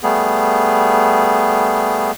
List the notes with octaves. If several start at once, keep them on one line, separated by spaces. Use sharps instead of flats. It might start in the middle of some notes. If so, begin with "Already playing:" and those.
G3 A3 B3 G#4